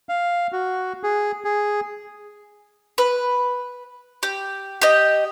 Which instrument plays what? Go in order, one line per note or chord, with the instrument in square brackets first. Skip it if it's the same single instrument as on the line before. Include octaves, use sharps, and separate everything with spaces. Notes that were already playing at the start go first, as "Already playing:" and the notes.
[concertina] F5
F#4
G#4
G#4
[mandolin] B4
G4
G4 D#5